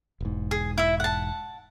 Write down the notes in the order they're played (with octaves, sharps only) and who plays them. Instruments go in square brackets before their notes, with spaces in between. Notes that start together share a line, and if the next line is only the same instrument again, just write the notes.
[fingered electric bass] E1 G#2
[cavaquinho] G#4
E4 E5
F#5 A5